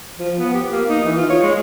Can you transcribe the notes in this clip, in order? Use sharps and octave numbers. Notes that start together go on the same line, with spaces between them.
F3
B3
G4
A#3
D#4
E3
F4
C#5
G#3